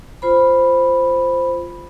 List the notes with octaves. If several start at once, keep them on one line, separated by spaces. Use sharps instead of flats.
F4 C5 B5